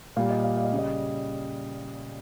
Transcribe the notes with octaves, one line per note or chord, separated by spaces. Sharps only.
A#2 G3 F5
D#5
F5
F5
D#5
C#3 G3
D#5